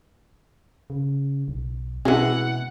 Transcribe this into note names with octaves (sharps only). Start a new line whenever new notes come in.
C#3
B1
B2 E3 G#3 C4 C#4 F#4 F#5